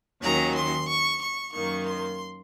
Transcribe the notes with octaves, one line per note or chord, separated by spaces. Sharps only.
D#2 D#3 F#3 C#4 A#5
C6
C#6
C#6
F#2 D#3 A#3 C#6
C6